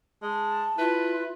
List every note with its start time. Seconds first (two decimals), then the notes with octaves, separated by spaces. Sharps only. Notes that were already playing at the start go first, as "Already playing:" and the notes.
0.22 G#3 A5
0.78 E4 F4 B4